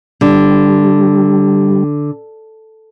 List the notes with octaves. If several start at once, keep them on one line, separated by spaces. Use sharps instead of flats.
D3 G3